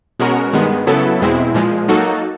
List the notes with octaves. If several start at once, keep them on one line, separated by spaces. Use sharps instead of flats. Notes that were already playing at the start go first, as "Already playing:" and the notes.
B2 G#3 C#4 F#4 A#4
G2 D#3 G#3 B3
C#3 F#3 B3 E4 A4
E2 B2 G#3 C4 E4
A#2 F3 G#3
F#3 A#3 D#4 F#4 A4